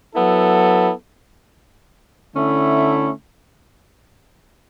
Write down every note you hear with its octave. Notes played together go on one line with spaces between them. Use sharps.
F#3 B3 E4 A4
D3 A3 C#4 E4